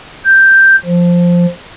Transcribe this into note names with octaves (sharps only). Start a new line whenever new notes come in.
G6
F3